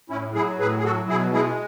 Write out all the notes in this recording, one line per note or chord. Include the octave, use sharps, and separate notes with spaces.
A2 C#4 E4
F#3 E4 G#4
A2 G#4 B4
G#4
F#3 F#4 A4
B2 E4 G#4
G#3 E4 G#4